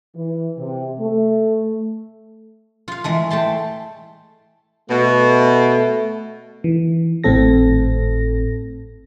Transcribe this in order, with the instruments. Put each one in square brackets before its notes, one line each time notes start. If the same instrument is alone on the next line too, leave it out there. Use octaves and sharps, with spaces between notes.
[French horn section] E3
C3
A3
[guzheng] F4 F5
E3 G#3 A3
A3 G5 A5 C6
[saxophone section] B2 [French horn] A3
[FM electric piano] E3
G#1 A2 C4 A4 A#6